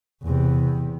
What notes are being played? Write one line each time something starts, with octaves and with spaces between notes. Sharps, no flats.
E2 C3